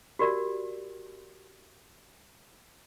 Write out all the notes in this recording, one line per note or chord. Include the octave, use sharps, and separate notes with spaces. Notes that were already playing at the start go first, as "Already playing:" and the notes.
F#4 G4 A#4 D5